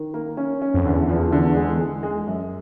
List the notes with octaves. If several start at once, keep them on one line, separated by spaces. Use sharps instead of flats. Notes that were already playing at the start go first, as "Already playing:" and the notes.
Already playing: D#3
A#3
C#4
C#4
F2
E2 D3
F3
D3
G#3
G#3
G#3
F#2